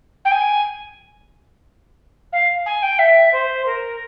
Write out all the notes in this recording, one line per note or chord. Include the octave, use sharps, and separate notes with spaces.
G5
G#5
F5
G#5
G5
E5
C5
A#4